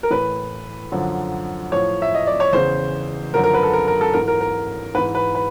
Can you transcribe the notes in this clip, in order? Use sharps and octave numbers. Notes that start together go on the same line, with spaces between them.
A#4
A2 E3 B4
F#2 D3 F3
A2 F3 C#5
E5
D#5
D5
C#5
E2 C#3 E3 C5
F#2 D3 F3 A#4
A#4
B4
A4
A#4
A#4
A4
G#2 E3 A#4
A#4
A#4
G#2 E3 B4
B4
B4